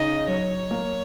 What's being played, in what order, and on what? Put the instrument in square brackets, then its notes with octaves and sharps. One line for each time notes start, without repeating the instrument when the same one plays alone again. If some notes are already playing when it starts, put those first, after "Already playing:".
Already playing: [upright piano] C#3 D#4 [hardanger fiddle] D#5
[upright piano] F#3 [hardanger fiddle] C#5
[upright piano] A#3